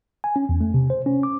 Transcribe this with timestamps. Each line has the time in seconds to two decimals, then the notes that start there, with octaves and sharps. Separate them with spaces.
0.24 G#5
0.36 C#4
0.49 E2
0.61 A3
0.74 C3
0.90 C5
1.06 C#4
1.23 D6